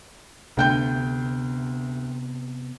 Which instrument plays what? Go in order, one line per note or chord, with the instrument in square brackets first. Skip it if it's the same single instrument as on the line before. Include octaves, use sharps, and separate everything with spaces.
[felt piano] D2 G5 G6 [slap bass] C3 B3